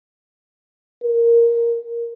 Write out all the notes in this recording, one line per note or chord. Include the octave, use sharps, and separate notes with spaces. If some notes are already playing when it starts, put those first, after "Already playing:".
A#4